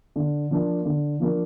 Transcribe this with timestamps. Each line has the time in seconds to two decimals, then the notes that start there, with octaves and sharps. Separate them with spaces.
0.16 D3
0.51 F3 A#3 D4
0.85 D3
1.20 F3 A#3 D4